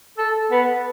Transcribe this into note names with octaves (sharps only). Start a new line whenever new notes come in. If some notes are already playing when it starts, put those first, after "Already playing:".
A4
B3